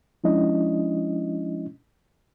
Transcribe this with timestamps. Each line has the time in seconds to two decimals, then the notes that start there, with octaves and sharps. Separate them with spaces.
0.24 F3 G#3 C#4 D4 E4 D#5